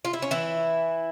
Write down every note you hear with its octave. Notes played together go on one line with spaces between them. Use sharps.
F4
E4
C#4
E3 E4